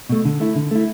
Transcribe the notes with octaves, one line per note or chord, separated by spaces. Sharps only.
B2 A3
D3
A3 E4
D3
A3 E4